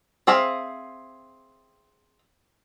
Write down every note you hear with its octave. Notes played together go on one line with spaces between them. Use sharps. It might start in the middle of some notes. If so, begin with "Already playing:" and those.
C4 G#4 E5 F5